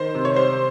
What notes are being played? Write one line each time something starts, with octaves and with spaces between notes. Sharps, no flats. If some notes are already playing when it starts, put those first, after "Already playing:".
Already playing: D#3 C5
C3
C#5
G3 C5